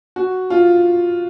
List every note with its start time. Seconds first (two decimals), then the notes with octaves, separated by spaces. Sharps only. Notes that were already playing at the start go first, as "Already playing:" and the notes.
0.16 F#4
0.50 F4